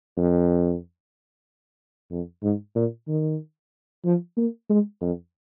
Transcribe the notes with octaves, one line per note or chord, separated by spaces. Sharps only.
F2
F2
G#2
A#2
D#3
F3
A#3
G#3
F2